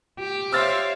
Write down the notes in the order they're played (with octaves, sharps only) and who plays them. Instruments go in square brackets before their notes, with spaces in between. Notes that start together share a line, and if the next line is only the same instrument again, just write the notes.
[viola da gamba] G4
[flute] C5 [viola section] C#5 E5 F5 [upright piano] E6 F6 A6